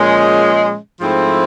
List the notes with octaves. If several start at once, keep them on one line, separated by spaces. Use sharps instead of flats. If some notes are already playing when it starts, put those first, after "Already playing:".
Already playing: A#2 F3 G#3 C#4
G#2 F3 A3 C4 E4